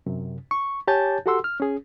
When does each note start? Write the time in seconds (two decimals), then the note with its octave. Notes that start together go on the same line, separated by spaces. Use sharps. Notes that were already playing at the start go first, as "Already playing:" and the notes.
0.06 F#2 C3
0.51 C#6
0.87 G4 C#5 G#5 A5 G6 A6
1.26 F#4 G4 A4 F#5 C6 E6
1.44 F6
1.60 C#4 G#4